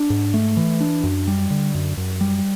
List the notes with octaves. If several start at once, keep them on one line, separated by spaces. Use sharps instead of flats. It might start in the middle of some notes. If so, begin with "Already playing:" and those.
Already playing: D4
G#2
A3
E3
D4
F#2
G3
D3
F#2
F#2
G3